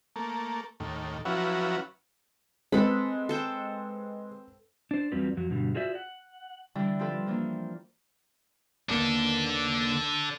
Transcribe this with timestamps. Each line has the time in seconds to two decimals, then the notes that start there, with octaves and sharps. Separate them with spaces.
0.16 A3 A#3
0.80 D#2 A2
1.25 F3 F#3 C#4 E4 F#4 B4
2.72 G#3 C4 A4 B4 B5
3.29 A4 C5 G5
4.91 D4 C5
5.12 E2 F#3 G3 C4 F4 B4
5.37 F2 F#3
5.50 G2 B2 D3 G3
5.75 F4 F#4 G#4 C5 D5 E5
5.95 F#5
6.75 D3 E3 G3 D4 E4
6.99 F3 C4 F4 G4 A4 B4
7.27 E3 F3 A#3 D4
8.89 D#2 A#3 B3 D4 A4